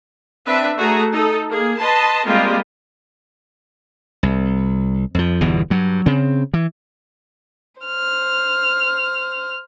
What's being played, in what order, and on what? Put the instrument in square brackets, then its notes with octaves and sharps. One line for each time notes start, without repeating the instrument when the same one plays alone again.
[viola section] C4 D4 B4 E5
A3 F#4 G#4 A#5
D#4 A4
A#3 G#4
B4 D#5 A5 C6
G3 G#3 A#3 C4 F4
[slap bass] C2
F2 F3
G1 E2 B2 E3
G2 F#3
C#3 C4
E3
[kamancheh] C5 F6